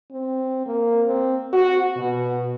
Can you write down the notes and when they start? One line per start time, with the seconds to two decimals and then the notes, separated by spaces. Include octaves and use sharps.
0.12 C4
0.66 A#3
1.07 C4
1.53 F#4
1.96 B2